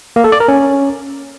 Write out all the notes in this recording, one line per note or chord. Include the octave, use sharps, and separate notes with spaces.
A#3
A4
D5
A#4
C#4